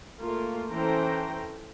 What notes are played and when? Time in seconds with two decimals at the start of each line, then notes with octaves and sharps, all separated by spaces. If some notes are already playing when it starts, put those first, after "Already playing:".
0.20 A3 A#3 F4
0.71 E3 C#4 A4 C5 G5 A#5